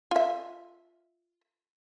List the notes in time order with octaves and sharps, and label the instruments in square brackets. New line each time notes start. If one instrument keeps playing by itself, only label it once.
[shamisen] F4 E5